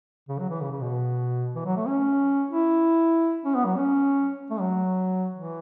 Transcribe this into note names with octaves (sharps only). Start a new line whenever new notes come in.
C#3
F#3
E3
C#3
C#3
B2
E3
F#3
A3
C#4
E4
C#4
B3
F#3
C#4
A3
F#3
E3